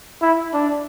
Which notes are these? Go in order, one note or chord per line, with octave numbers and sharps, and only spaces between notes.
E4
D4